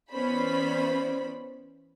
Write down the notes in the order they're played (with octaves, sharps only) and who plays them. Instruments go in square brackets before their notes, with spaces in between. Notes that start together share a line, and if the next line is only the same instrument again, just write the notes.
[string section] E3 B3 C#4 C5 D5 B5